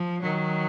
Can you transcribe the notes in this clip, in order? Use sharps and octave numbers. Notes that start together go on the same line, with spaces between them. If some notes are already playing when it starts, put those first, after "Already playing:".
Already playing: F3
D#3 F#3